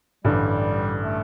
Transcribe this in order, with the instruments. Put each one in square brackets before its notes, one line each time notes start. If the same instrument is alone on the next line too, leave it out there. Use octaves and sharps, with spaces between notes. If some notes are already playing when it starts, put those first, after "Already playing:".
[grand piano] A1 G2 D3 [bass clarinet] G3
[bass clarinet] A3